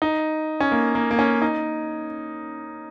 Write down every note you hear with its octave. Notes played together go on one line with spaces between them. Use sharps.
D#4
C#4
A#3
A#3
A#3
C#4
D#4